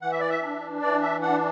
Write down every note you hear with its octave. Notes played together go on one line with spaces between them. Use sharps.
E3 F#5
E5
D5
E5
D4
E3 D5
E5
D4 F#5